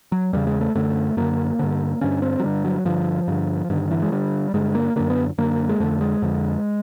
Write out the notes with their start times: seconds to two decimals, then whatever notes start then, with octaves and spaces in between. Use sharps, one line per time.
0.12 F#3
0.33 E2 C#3 G3
0.47 G#3
0.61 A3
0.75 F#2 D3 A3
1.17 F#2 D3 A#3
1.59 G2 D3
2.01 G2 D3 C#4
2.22 C4
2.40 F#3
2.43 G2 D3 G3
2.65 F#3
2.85 G2 D3 F3
3.28 G2 D3
3.70 G2 D3 D#3
3.91 E3
4.02 G#3
4.12 G2 D3 G3
4.54 G2 D3 G#3
4.75 A#3
4.96 F#2 D3 A#3
5.10 B3
5.38 F#2 D3 A#3
5.69 G#3
5.80 F2 D3 A3
6.01 G#3
6.22 F2 D3